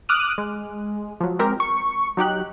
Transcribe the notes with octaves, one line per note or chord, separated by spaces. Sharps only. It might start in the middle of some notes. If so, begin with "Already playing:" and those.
D6 D#6 F6 F#6 D#7
G#3
F3 F#3
G#3 C4 G4 A#4
C#6
F#3 D#4 G4 F#6